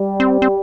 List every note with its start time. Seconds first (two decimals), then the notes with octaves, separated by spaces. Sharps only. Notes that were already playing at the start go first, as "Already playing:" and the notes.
Already playing: G3
0.20 C4
0.42 C4